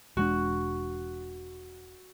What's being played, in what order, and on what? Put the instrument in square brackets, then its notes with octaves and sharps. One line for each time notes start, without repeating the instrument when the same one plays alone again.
[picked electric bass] E1 G#3 D4 [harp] F#4